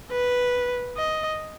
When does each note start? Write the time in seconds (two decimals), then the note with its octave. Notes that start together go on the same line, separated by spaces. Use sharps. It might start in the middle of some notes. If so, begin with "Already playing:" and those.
0.12 B4
0.97 D#5